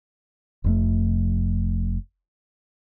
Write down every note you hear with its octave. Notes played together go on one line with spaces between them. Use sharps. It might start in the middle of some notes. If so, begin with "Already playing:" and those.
F1 F2 A3